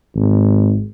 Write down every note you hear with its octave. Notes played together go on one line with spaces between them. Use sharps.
G#1